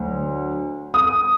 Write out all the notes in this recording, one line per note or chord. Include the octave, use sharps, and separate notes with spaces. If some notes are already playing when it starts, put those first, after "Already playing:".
Already playing: D2 F#3
D#6